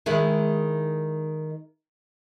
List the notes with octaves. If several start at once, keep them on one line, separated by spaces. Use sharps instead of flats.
D#3 G#3 E4